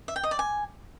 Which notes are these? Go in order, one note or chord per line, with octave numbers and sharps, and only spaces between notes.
E5
G5
D#5
D5
G#5